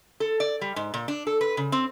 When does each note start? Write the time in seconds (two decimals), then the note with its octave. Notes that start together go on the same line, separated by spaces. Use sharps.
0.20 A4
0.40 D5
0.61 G3
0.76 G#2
0.94 A#2
1.08 D4
1.27 A4
1.41 B4
1.57 C#3
1.72 C4